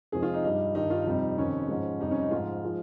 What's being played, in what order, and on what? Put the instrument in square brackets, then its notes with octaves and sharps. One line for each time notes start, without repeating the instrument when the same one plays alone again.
[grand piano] F2 C3 F3 G#3 G#4
F4
D#4
G2 G3 D#4
G2 D#3 G3 D#4
F4
F2 C3 G3 D#4
F2 C3 D#3 C#4
G#2 F3 G#3
F2 C3 G3 D#4
C#4
D#4
G#2 F3 G#3 F4
F3 G#3